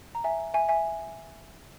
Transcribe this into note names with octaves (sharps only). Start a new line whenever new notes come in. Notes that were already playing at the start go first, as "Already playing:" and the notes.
A#5
E5 G#5
E5 G#5
E5 G#5